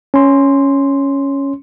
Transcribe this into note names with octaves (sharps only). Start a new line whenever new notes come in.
C#4 C6